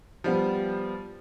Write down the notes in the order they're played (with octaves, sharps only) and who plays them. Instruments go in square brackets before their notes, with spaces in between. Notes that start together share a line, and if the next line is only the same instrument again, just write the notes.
[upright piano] F3 G3 B3